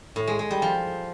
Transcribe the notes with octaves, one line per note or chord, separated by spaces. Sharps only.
A2
G#3
G#3
G3
F3